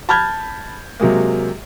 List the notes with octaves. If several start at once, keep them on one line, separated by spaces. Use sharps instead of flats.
A5 B5 F6 G6 G#6
C3 F#3 G#3 A#3